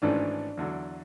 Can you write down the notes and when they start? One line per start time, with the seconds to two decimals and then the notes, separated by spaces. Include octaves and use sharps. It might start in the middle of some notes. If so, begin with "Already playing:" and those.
0.02 G#1 G#2 E3 A3 C#4 D4 D5
0.57 E2 D3 F#3